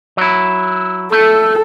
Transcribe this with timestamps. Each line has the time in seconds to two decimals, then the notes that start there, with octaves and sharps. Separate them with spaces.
0.17 F#3 E4
1.12 A3 A4